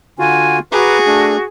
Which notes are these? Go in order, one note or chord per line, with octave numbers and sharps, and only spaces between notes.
D3 F4 F#4 G#5
F#4 G#4 B4 A#5 D6
A3 D4